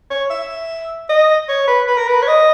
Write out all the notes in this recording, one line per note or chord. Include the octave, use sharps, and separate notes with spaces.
C#5
E5
D#5
C#5
B4
B4
A#4
B4
C#5
D#5